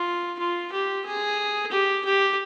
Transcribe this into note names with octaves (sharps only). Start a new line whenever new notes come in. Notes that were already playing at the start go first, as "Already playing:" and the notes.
Already playing: F4
F4
G4
G#4
G4
G4